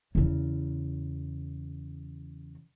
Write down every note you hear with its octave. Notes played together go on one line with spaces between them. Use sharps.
E2 C#3